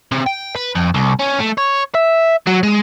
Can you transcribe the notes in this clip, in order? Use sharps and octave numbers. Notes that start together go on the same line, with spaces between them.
C3
G5
B4
F2
C2
C#4
A3
C#5
E5
F#3
G#3